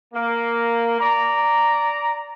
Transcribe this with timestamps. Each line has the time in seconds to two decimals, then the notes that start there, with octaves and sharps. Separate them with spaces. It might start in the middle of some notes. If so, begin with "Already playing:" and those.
0.14 A#3
1.00 D5 A#5